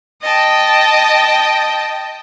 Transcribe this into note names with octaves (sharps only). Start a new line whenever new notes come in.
D#5 G5 A5